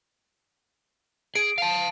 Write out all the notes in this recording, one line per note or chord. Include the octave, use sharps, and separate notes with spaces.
G#4 D7
F5 A5